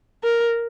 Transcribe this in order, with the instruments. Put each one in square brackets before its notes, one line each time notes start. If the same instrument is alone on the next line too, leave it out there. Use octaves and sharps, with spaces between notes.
[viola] A#4